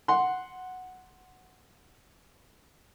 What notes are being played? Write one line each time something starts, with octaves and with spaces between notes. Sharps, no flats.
F#5 C6